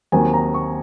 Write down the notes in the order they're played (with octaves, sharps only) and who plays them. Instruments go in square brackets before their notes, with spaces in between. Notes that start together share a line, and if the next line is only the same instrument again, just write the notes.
[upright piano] D#2 D#3 F#3 C4 G#5
A#5
C#6